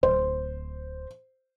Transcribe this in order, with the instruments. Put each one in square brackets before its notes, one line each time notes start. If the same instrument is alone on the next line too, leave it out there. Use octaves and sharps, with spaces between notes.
[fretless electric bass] D1 [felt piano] C5